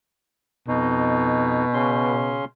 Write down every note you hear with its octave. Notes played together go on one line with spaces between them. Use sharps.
F2 B2 D#4
C#3 C#4 C6